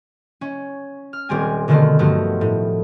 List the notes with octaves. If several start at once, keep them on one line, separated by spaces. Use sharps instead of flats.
C#4
F6
D#1 G3 C4 G#5
B2 D3 D#3 A3 B3 C4
G2 F3 A3 D#4 F#4
A2